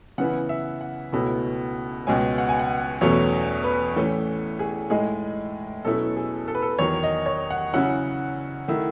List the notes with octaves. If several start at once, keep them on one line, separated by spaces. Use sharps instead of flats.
C#3 E3 B3 E4 F#5
E5
F#5
C#2 B2 A3 C#4 E4
C#2 B2 G#3 C#4 G#5
F#5
G#5
F#5
E2 B2 F#3 A3 C#4 C#5
B4
A2 E3 A3 C#4
G#4
A2 G#3 D#4 G#4
B2 F#3 A3 C#4 E4 A4
G#4
A4
B4
A4
E2 D#3 F#3 C#5
D#5
C#5
F#5
C#3 F#3 C#4 E4 F#5
D#3 A3 E4